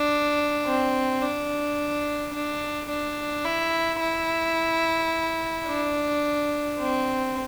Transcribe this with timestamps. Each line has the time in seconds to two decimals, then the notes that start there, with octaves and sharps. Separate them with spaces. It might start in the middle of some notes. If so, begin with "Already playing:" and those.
Already playing: D4
0.67 C4
1.22 D4
2.33 D4
2.89 D4
3.45 E4
4.00 E4
5.67 D4
6.79 C4